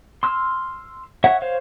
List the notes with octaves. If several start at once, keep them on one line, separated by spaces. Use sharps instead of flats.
C6 E6 F6
C#5 E5 F#5
C5 C#5 F5